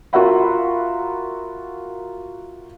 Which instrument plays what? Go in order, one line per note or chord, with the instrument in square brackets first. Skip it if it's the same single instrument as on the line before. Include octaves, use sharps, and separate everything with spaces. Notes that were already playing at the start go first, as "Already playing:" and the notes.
[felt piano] F4 F#4 A#4 E5 F#5 B5